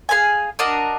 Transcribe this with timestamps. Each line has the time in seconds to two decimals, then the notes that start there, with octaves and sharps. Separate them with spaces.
0.09 G#4 B4 F5 G#5
0.59 D4 F#4 A#4 D#5